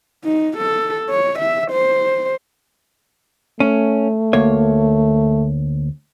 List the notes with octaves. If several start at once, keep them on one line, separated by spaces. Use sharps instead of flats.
D#4
A4
C#5
E5
C5
A3 C#4
D2 A#3 C#5